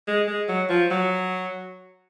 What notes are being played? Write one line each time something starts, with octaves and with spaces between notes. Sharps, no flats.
G#3
G#3
F#3
F3
F#3